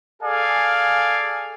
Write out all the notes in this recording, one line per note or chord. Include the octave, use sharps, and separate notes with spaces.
G#4 A4 D5 F5 G#5